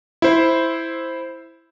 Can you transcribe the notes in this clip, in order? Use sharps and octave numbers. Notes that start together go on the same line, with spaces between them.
E4 C5